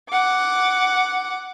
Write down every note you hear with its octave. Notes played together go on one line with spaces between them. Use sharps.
F#5 D6